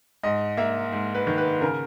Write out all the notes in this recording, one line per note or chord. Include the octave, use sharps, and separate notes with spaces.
G#2 D#5
A#3 E5
G#2
B4
D#3
B4
C#3 A#4